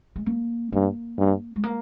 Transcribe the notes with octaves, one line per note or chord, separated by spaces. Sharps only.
G#3
A#3
G2 A#3
G2
G#3
A#3